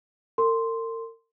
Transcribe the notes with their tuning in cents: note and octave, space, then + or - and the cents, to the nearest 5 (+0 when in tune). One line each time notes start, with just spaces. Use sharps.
A#4 -45 C6 +0